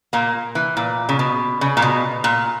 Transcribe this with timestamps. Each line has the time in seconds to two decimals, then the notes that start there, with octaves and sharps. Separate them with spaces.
0.13 A#2 A#3
0.55 E3
0.77 A#2
1.09 C#3
1.19 B2
1.61 C#3
1.77 A#2
1.82 B2
2.24 A#2